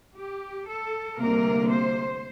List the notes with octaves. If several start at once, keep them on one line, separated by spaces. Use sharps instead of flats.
G4
A4
D2 C3 G3 A#3 A#4
C5